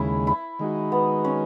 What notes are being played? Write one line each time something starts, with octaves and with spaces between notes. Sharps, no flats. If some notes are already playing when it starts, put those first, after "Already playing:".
Already playing: D#2 C#3 G#3 E4
E4
D#3 G#3 D#4 F#4
B3
C#4